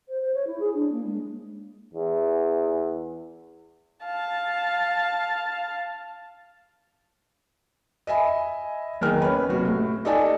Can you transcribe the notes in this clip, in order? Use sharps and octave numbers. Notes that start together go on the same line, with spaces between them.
C5
C5
C#5
E4
G#4
D4
A#3
G#3
E2
F5 A5
D#5 E5 G#5 B5
F#1 E2 D#3 A#4 F6
C#4 B4
F#1 C3 F#4
A2
D#4 G4 A4 D5 G#5